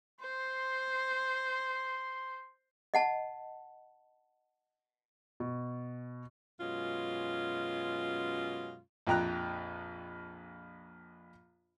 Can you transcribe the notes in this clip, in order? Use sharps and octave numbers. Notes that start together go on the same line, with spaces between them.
C5 C6
D#5 F#5 A5
B2
F#2 B2 G#3 C#4 F4
A#1 F2 G5 A#5 F#6